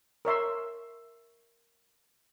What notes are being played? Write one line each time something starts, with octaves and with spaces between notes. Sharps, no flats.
A#4 C#5 E5 C6